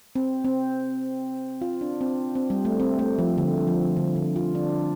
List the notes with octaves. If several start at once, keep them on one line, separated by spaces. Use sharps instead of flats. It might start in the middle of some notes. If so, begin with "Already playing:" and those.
C4
C4
F4
D4
C4
C4
G3
A3
C4
A3
F3
D3
F3
D3
D3
F4
D4